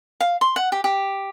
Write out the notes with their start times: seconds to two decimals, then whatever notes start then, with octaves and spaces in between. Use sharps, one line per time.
0.20 F5
0.41 C6
0.56 F#5
0.72 G4
0.84 G4